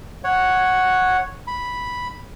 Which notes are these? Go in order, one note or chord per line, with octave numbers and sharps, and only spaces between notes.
C#5 F#5
B5